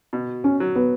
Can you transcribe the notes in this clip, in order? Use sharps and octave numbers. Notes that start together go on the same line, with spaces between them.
B2
C#4
F#3
B3